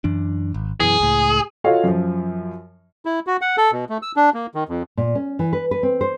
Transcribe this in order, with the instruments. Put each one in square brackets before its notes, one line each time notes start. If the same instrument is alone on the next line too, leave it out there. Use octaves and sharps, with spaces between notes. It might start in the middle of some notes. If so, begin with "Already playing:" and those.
[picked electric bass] F#2 E3 D4
G#1
[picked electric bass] F#2 B2 E3 [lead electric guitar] G#4
[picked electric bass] C#2 A2
[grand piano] F4 F#4 A4 C#5 D#5 F5
F#2 F3
[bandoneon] E4
F#4
F#5
A4
B2
A3
E6
D4
A#3
D#3
F2
[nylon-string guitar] A#2
C#4
E3
B4
B4
C4
C5